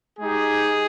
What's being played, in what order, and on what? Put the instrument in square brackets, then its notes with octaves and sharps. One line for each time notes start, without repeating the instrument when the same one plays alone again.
[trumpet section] G#3 D#4 G4 G#4